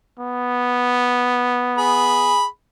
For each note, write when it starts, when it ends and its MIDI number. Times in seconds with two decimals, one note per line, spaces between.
0.19 2.38 59
1.78 2.45 68
1.78 2.45 83